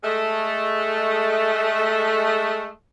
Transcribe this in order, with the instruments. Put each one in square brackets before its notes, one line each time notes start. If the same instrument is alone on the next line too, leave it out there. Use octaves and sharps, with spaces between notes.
[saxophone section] G#3 A3